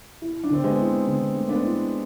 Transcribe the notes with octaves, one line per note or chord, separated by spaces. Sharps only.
E4
D4
D3 C4
G#3 B3
E4
D3
A3
B3 D4
E4